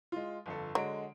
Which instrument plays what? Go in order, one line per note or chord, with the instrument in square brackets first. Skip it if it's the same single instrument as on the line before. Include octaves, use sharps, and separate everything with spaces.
[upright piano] G#3 F4
G1 F2 A4
[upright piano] D3 G#3 D7 [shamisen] F#3